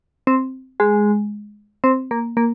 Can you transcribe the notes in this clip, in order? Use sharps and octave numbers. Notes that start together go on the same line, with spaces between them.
C4
G#3
C4
A#3
A#3